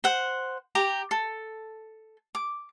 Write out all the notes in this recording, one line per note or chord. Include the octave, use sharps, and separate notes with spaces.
C5 F#5
G4 A#5 D6
A4
D6